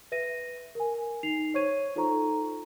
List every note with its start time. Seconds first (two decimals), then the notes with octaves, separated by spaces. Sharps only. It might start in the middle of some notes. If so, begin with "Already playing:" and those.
0.12 B4 E5 A#6 D#7
0.75 A#4 G#5
1.23 D#4 C7 F7
1.54 C5 C#5 C#6 G#6 D#7
1.96 D#4 F4 A4 C5 A#5 C#6